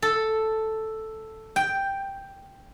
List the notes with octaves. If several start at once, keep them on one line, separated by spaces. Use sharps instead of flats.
A4
G5